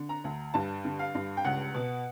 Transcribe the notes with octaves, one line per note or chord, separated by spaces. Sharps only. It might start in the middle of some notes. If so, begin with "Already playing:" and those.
Already playing: D3
A#5
D2
G2 A5
D3
F5
G2
G5
C#2 F#5
B2